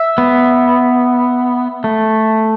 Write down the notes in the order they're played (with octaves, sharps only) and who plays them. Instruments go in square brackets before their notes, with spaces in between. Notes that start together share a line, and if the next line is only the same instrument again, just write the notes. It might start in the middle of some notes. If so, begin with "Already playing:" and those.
Already playing: [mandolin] E5
[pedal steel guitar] B3
A3